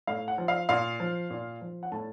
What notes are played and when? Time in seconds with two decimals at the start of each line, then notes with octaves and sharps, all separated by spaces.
0.07 A2 F5
0.28 F#5
0.38 F3
0.48 F5
0.69 A#2 F5
1.00 F3
1.30 A#2
1.61 F3
1.83 F#5
1.92 A2 A5